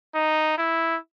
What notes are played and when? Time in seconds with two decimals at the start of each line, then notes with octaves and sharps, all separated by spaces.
0.14 D#4
0.58 E4